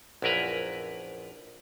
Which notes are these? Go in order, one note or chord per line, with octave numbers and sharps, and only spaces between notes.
A#1 F#2 E4 A#4 B4 A#5